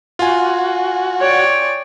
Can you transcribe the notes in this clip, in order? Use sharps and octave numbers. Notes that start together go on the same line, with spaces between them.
F4 F#4 G#5
C#5 D5 G5